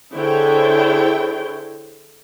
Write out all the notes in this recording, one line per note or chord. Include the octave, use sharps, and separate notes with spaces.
D3 E4 G#4 C5 C#5 G5